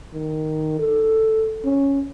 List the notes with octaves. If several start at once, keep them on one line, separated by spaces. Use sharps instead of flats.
D#3
A4
C#4